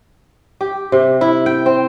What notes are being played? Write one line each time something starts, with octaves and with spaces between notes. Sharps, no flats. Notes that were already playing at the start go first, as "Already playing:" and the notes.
G4
C3
E4
G5
C4